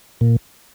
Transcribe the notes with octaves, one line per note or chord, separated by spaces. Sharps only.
A#2